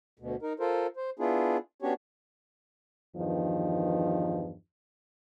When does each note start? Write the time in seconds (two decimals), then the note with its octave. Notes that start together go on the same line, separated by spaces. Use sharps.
0.19 D2 B2
0.42 D#4 A#4
0.60 F4 A4 A#4 C5
0.97 C5
1.19 B3 D4 E4 F4 G#4
1.82 B3 C#4 D4 F#4 G4 C#5
3.16 E2 G2 D#3 F3